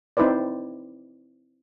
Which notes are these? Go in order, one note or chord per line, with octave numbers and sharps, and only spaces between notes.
C4 D#4 E4 B4 C5 D5